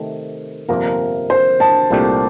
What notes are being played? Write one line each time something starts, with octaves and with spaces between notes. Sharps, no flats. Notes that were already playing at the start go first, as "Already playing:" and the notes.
Already playing: C3 D#3 A3
G1 F2 C3 F3 A#3 A#4
C5
A5
C2 A#2 A3 D4 G4